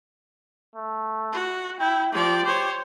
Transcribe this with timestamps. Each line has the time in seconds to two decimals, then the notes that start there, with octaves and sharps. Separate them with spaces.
0.75 A3
1.32 F#4
1.80 E4 G5
2.12 F3 G4 D5
2.45 C5 C#5